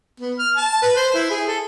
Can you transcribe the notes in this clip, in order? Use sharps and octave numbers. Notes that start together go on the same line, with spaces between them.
B3
F6
A5
B4
C5
E4
G#4
A4